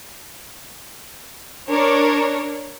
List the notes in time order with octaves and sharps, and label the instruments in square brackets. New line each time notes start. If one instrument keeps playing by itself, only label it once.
[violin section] D4 A#4 C#5